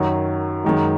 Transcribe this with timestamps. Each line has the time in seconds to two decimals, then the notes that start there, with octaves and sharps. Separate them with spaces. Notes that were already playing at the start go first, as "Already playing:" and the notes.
Already playing: F#2 D#3 F#3
0.64 F#2 D#3 G#3